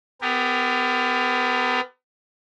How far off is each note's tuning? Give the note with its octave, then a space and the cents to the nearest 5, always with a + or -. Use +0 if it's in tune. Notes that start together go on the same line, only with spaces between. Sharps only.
B3 +35 G4 +30 A#4 +0